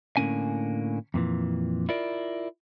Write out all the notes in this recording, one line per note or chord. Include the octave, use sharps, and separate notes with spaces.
A2 D3 A#3 C#4 G#5
F2 A#2 E3
E4 F4 A#4 D5